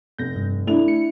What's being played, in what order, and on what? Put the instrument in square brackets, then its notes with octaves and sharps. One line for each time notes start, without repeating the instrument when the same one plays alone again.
[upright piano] F1 [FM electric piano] G6 A#6
[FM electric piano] G2
[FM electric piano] A3 [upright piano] D4 E4 F7
[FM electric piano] C#7